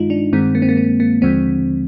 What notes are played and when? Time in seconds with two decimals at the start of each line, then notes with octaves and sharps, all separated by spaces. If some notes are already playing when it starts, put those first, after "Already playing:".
Already playing: G2 D#3 G#3 D#4 F4
0.10 D4
0.33 G2 D#3 G#3 C4
0.55 A#3
0.62 C4
0.69 A#3
0.77 C4
1.00 A#3
1.22 D#2 D3 F3 G#3 C4